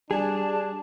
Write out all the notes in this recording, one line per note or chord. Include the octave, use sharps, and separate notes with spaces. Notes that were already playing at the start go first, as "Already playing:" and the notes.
G3 D4 G#4 A5